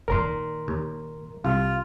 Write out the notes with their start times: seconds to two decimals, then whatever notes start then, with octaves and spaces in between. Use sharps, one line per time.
0.08 A#2 D#3 A#4 A#5 C6
0.68 D#2
1.45 C2 F4